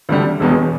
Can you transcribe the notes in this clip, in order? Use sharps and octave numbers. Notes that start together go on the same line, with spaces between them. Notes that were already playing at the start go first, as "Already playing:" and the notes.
D2 D3 G3
E1 E2 B2